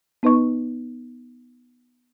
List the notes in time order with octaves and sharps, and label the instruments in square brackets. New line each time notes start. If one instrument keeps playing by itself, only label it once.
[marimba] B3 D#4 B4 D#5 C#6